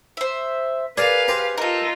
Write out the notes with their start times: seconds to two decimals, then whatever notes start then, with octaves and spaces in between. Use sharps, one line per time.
0.17 C5 E5
0.97 G#4 A#4 B4 D5 F5
1.28 G4 C5 A#5
1.58 D#4 F4 A4 A#4